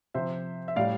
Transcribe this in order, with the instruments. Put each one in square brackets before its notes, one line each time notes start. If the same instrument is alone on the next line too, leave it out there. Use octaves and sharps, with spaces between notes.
[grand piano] C3 F3 C5 E5
E5
A2 G3 D5 F5